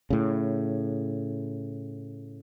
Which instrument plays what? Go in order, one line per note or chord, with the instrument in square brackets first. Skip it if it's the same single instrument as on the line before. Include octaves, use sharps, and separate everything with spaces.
[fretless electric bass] A2 C#3